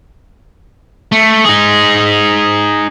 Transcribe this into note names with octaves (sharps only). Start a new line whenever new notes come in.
A3
D#4 G#4